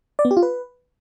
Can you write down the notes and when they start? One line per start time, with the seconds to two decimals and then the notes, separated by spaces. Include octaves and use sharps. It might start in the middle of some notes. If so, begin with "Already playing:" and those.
0.19 D5
0.25 B3
0.31 G4
0.37 F4
0.43 B4